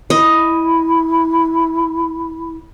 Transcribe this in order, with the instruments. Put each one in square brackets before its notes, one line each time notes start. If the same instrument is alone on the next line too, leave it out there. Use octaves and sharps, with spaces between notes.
[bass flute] E4 [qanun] D#5